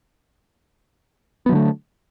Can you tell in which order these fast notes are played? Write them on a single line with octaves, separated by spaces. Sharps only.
B3 F#3 D3 A3